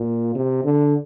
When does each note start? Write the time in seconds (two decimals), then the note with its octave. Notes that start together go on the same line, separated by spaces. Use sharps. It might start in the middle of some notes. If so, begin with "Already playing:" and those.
Already playing: A#2
0.35 C3
0.64 D3